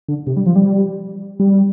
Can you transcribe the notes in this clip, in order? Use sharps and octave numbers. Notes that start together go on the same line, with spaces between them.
D3
C3
G3
F3
G3
G3